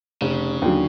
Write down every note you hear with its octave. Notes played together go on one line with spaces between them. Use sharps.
F1 C#3
D#2 D3 F#3